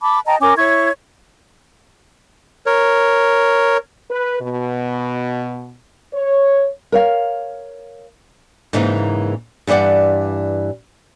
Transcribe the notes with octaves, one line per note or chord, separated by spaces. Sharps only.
A5 B5 D6
D#5 G5 A5 A#5
C#4 A#4 G#5 D6
E4 C#5 C#6 G#6
A#4 C#5
B4
B2
C#5
A#4 C#5 F5
G#2 C#3 E3 A#3 D#4
G2 E3 G3 D5 F#5